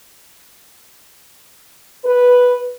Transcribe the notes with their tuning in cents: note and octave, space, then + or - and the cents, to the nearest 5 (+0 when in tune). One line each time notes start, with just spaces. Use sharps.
B4 -5